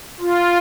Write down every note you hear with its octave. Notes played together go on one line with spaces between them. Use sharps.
F4